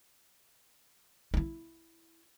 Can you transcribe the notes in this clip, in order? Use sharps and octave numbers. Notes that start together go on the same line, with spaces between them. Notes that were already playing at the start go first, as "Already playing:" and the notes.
D#4 E4